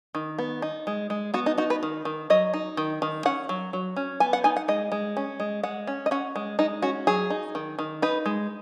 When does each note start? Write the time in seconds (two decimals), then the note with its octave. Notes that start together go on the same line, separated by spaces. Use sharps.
0.15 D#3
0.38 B3
0.62 D#4
0.87 G#3
1.10 G#3
1.34 B3 F#4
1.46 D#4
1.58 D#4 F#4
1.70 B4
1.83 D#3
2.05 D#3
2.30 F#3 D#5
2.54 D#4
2.77 D#3
3.02 D#3
3.25 C#4 F#5
3.49 F#3
3.73 F#3
3.96 C#4
4.20 B3 G#5
4.33 F#5
4.44 D#4 G#5
4.56 F#5
4.68 G#3 D#5
4.92 G#3
5.17 C#4
5.40 G#3
5.63 G#3 F#5
5.87 C#4
6.06 D#5
6.11 C#4 F#5
6.36 G#3
6.59 G#3 D#4
6.82 C#4 F#4
7.07 F#3 G#4
7.30 D#4
7.55 D#3
7.79 D#3
8.02 D#4 B4
8.26 G#3